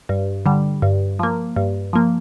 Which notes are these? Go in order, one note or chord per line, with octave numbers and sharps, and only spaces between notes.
G2
D3 G3
G2
F3 A#3
G2
F3 A#3